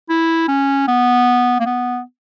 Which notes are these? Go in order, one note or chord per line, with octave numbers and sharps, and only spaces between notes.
E4
C#4
B3
A#3
B3